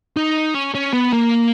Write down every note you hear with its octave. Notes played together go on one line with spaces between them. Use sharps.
D#4
C#4
C#4
B3
A#3